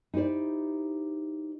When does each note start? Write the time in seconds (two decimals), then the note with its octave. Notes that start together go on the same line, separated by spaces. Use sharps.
0.14 D#4 E4 G4 C5 D5